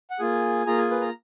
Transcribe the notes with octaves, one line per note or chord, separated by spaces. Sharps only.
F#5
A#3 F4 G#4 G#5
A#3 F4 G#4 A#5
G#5
B4
A#5